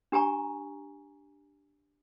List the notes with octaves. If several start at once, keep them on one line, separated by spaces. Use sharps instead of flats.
D4 G4 G#5 A#5 C#6